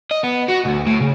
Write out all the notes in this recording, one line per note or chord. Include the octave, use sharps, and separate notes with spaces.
D#5
B3
F#4
D2
A2
C#3